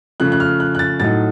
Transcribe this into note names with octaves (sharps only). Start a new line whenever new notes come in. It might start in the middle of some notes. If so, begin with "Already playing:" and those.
C#3 F3 A3 F#6
F#6
F6
F#6
F#6
A6
A2 F#3 A3 D#4 A6